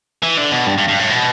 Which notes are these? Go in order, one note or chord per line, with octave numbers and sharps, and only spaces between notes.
E3
D3
B2
G2
G2
G2
A2
B2